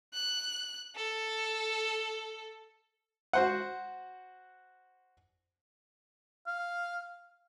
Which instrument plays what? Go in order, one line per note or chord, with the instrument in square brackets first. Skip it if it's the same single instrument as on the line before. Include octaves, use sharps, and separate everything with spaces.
[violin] F#6
A4
[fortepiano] F#4 C5 F#5
[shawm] F5